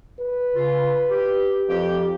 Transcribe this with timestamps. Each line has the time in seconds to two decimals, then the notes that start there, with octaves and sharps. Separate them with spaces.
0.19 B4
0.55 C#3 F4
1.10 G4
1.68 F2 G4